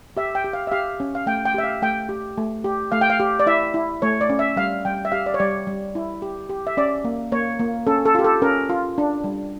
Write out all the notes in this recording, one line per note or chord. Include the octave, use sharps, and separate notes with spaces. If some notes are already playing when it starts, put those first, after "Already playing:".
G4 E5
G5
G4
F5
E5
G4 F5
C#4
F5
A3 G5
G5
G4 E5
F5
A3 G5
G4
A3
G4
A3 F5
G5
F5
G4
D5
E4 E5
E4
A3 C#5
D5
C#4
E5
G3 F5
G3 G5
E5
G4 F5
D5
C#5
G3 D5
G3
E4
G4
G4
E5
C#4 D5
A#3
A#3 C#5
A#3
C#4 A4
A4
F4 G4
A4
C#4 A#4
F4
D4
G3